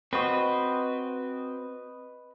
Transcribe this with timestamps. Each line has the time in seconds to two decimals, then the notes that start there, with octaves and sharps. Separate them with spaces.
0.13 C4 F#4 B4 D#5 B5